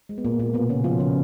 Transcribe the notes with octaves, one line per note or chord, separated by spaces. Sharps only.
G#3
B3
A#2 A#3
A#2 A#3
B2 B3
C#3 C#4
F3 F4
C#3 C#4